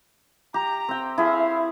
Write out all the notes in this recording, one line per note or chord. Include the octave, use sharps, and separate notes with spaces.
G4 A#5
C4 G5
E4 G#4 E5 F5